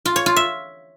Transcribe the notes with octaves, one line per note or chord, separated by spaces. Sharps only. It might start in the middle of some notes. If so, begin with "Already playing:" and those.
F4
C#5
F4
E5